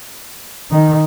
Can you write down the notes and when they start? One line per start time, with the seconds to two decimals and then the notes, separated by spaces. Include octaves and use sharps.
0.71 D#3